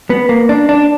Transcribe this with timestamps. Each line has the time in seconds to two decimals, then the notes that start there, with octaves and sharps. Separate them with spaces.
0.10 B3
0.29 A#3
0.49 D4
0.69 D4